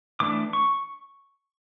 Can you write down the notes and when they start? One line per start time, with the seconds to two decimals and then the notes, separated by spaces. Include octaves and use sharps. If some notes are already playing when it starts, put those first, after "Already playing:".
0.20 E3 A3 D4 D6
0.53 C#6